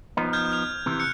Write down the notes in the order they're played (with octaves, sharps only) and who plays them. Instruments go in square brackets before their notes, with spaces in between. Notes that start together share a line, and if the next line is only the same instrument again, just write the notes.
[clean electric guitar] F3 B3 D#4
[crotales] F6 G6 G#6
F6 F7
[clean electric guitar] C3 E3
[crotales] F#6 C#7